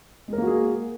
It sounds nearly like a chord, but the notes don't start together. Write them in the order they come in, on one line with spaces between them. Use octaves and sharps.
G#3 A#4 A#3 F#4 G#4